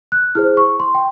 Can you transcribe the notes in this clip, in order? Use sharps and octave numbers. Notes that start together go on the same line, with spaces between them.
F#6
E4 G#4 C5 F6
C#6
C6
G5